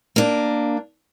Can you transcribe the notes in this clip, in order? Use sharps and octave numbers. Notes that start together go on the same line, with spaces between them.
A#3 D4